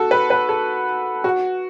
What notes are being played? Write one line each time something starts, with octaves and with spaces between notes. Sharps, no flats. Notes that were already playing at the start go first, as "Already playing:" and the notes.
Already playing: F#4 A4
B4
B4
A4
F#4